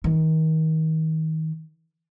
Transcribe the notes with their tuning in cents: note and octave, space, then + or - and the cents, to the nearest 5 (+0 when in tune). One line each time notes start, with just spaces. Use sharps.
D#3 +35